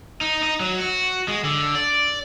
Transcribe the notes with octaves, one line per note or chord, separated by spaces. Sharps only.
D#4
D#4
F#3
F#4
G#3
D3
D5